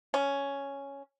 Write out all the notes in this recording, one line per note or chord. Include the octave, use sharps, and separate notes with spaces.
C#4